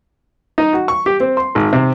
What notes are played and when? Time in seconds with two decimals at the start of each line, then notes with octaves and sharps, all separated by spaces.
0.58 D#4
0.73 F#4
0.88 C#6
1.06 G4
1.20 C4
1.37 C6
1.55 G#1
1.73 C3